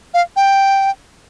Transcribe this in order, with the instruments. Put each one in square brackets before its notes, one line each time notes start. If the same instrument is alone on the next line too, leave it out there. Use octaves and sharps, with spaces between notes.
[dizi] F5
G5